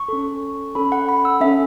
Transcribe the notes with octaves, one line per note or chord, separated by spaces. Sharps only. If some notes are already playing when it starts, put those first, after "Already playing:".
Already playing: C#6
C#4 A4
C#4 A4 B5
F#5
B5
E6
C#4 A4 E5